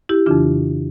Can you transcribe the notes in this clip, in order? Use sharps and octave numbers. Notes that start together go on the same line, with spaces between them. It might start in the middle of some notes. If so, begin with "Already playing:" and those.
E4 G4
F2 C#3 E3 D4 F4